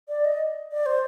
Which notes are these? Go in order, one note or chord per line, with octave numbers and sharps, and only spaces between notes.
D5
D#5
D5
C5